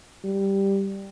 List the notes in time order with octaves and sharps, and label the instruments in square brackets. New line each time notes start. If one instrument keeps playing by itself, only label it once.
[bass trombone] G3